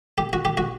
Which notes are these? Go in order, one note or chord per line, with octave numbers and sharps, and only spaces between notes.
G4
F#4
G4
F#4